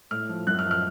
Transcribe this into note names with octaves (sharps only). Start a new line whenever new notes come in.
A2 F6
F3
F#2 F#6
F6
F3
F6